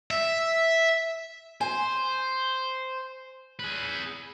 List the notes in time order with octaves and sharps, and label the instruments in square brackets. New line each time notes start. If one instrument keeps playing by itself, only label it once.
[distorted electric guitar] E5
[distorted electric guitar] C5 [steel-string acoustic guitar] G#5
[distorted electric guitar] G#4 B4